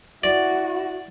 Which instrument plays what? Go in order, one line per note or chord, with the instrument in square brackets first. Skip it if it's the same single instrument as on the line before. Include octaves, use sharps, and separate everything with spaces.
[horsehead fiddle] E4 F#4 [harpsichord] D5